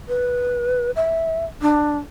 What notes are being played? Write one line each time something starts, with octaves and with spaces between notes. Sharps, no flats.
B4
E5
D4